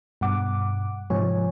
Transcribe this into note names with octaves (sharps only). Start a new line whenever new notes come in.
G2 B2 F#5 D6
G#2 C3 F3 C#5 G#5